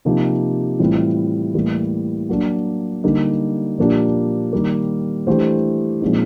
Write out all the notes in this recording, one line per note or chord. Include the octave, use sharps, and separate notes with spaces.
C3 F3 A#3 D#4 G4
A2 E3 G3 C4 F4
A2 E3 G3 A#3
F#3 A#3 D4
D3 G3 A#3 D#4
A#2 F3 A#3 D4 G4
D#3 G3 A#3
E3 A3 D4 G4 C5
A#2 F3 G#3 C4 D#4